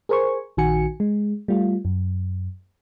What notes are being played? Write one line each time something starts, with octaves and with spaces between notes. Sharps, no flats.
G#4 A#4 C5 G#5 C#6
A#1 D#3 F#4 G#5 C#7
G#3
G3 A3 F4
F#2